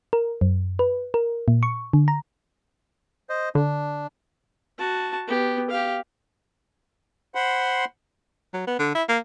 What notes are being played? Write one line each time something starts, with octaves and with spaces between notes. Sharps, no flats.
A#4
F#2
B4
A#4
A#2
C#6
D3
A#5
C5 D#5
D3 D4
F#4 A5
B3 G4
G4 F5
C5 F#5 B5 C6
F#3
B3
D3
E4
A#3